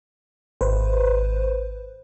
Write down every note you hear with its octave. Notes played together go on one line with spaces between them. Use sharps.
G#1 B4 C5